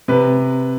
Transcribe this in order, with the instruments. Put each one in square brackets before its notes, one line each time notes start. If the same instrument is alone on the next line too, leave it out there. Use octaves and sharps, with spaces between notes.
[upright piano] C3 B4